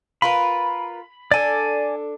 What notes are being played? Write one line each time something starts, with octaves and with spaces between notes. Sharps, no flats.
F4 A#4 B4 B5
D4 A4 D5 G#5